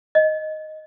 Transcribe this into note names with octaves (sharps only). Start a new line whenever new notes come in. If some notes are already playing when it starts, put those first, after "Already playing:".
D#5